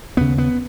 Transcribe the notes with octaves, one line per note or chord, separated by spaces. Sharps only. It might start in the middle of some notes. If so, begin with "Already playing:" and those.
D#2 C#3 B3
B3